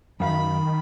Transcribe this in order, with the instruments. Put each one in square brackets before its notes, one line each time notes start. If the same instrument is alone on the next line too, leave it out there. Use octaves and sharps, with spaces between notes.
[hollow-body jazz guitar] F#2 F5 [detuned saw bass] D#3 [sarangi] B5